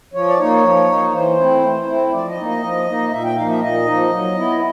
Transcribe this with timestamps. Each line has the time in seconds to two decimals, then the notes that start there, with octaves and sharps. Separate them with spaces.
0.13 F3 C#5
0.29 D5
0.38 A#3 D#4 C#5
0.63 F3
0.88 A#3 D#4
1.13 E3 C5
1.38 A3 C4 E4
1.63 E3
1.87 A3 C4 E4
2.12 F3 D5
2.28 D#5
2.37 A#3 D#4
2.46 D#5
2.63 F3
2.86 A#3 D#4
3.12 A#2 E5
3.25 G5
3.36 F3 A#3 D#4 F5
3.49 E5
3.62 A#2 D#5
3.86 F3 A#3 D#4
4.11 F#3
4.35 B3 E4